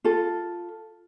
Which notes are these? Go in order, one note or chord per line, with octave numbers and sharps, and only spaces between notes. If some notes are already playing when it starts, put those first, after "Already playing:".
F4 A4